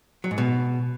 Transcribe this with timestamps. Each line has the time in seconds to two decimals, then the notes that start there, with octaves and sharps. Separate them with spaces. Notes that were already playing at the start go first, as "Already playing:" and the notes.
0.24 F#3
0.31 G#2
0.38 B2